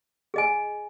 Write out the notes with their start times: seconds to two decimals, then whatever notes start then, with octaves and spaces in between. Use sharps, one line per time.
0.34 G#4 D#5 G#5